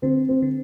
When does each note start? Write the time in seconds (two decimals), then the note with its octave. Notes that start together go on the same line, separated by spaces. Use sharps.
0.02 D3 C4
0.29 C4
0.42 D3